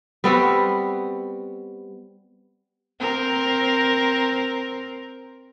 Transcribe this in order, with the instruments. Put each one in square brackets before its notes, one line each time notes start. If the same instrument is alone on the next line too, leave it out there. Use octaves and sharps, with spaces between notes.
[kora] G3 B3 C4 F#4
[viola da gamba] C4 A#4